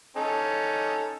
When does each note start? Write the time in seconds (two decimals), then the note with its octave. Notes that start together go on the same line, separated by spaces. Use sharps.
0.17 C#4 D#4 A4